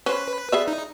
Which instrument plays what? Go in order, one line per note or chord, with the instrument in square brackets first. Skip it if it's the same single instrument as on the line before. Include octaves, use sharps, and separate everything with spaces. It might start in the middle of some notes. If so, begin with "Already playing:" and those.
[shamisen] C#4 C5 [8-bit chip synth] B4
[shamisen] G#4 D5 E5
[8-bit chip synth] D#4